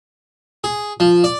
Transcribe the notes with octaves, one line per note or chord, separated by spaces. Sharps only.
G#4
F3
D5